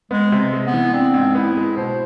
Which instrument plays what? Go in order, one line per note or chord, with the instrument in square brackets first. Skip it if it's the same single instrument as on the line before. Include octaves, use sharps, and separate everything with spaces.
[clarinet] G#3 [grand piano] B3
[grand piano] C3
G#3
[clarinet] B3
[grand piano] E3
[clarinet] C4 [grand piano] D4
[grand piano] G#2
[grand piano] B3 [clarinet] E4
[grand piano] G#3
[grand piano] B2 [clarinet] C5